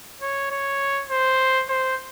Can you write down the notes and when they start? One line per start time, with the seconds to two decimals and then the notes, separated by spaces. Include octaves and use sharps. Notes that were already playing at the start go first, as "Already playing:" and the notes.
0.21 C#5
0.51 C#5
1.10 C5
1.69 C5